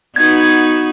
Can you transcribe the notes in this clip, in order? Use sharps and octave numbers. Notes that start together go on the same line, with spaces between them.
B3 D#4 F#4 G#6